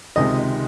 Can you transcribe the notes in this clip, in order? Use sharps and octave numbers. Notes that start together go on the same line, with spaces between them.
C#2 C3 D#3 G#3 D#5